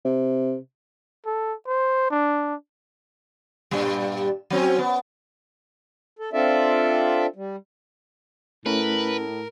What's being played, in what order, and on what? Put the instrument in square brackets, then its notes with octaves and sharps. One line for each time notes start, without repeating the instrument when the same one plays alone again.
[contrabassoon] C3
[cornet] A4
C5
D4
[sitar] G2 A#2 G3
F#3 C4 C#4
B3
[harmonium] A4
C4 D4 F4 A4 D5 E5
G3
[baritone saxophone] A2 [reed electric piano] A3 C#4 E4 [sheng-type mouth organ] A#4 [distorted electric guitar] B4